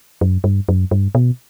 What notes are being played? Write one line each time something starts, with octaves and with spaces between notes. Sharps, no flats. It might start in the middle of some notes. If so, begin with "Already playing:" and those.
F#2
G2
F#2
G2
B2